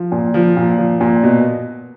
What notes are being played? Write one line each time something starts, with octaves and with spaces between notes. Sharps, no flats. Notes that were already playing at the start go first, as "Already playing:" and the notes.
Already playing: F3
A#2
F3
A#2
F3
A#2
B2